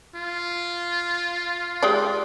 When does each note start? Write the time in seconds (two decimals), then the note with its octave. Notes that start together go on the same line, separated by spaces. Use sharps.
0.15 F4
1.83 G#3 G4 D5